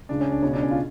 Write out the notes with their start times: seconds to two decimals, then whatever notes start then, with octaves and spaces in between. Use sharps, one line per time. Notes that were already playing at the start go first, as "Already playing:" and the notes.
0.09 C#2 C#3 D4
0.21 C#4
0.31 D4
0.42 C#2 B2 C#4
0.53 D4
0.63 C#4
0.71 F4